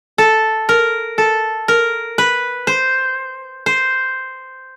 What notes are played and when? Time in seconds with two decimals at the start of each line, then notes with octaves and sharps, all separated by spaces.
0.18 A4
0.69 A#4
1.18 A4
1.68 A#4
2.18 B4
2.67 C5
3.66 C5